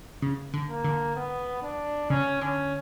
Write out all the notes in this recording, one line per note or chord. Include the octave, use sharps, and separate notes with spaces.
C#3
D3
A#3
D3
B3
D4
C#3 C#4
D3 C#4